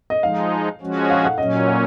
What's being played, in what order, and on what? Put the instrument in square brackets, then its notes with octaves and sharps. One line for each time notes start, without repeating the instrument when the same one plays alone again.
[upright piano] D#5
[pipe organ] F3 G#3 D#4 [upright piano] F5
[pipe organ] F3 G#3 C#4 F#4
[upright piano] F5
F#5
[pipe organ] A#2 F#3 C#4 [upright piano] D#5
[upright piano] C#5